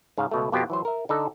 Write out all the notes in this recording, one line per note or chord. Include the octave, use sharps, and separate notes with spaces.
G#2 C#3 F5
C#2 B2 A3
F2 B2 B3 G4 C5
E3 F#3 C5
A#4 E5
D3 D#4 A4